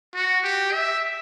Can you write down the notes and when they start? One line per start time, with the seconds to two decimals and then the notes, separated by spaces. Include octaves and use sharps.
0.15 F#4
0.44 G4
0.73 E5